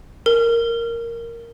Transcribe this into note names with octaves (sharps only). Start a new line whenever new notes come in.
A#4